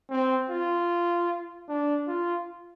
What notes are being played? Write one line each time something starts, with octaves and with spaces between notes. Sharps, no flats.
C4
F4
D4
F4